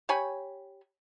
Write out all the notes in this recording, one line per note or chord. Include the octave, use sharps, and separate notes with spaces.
G4 C#5 G#5 B5